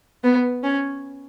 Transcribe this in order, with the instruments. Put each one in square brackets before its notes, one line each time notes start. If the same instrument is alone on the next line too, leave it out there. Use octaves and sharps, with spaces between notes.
[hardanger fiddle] B3
C#4